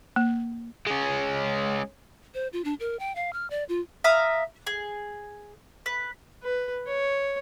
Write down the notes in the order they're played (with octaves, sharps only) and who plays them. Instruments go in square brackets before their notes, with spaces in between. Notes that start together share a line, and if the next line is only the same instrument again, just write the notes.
[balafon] A#3
[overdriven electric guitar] G#3 C#4
[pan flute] C5
F4
D4
A#4
G5
F5
F6
D5
F4
[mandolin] E5 F5 A#5 D#6
G#4
B4
[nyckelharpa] B4
C#5